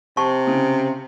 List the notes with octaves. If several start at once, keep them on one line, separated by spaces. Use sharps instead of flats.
C3 A5 C#6
C#3